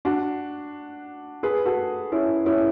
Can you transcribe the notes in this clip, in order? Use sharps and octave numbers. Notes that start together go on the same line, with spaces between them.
D4 F#4
G#4 B4
F#4 A4
C#4 E4
C#4 E4